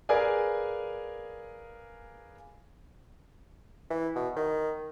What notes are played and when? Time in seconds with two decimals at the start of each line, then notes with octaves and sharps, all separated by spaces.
0.09 G#4 A#4 B4 D5 F5 G#5
3.90 E3
4.16 B2
4.36 D#3